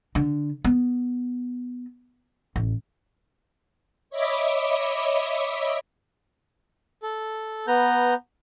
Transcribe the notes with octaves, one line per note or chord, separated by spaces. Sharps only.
D3
B3
A1
C#5 D#5 E5 B5 D6
A4
B3 B4 A#5 G6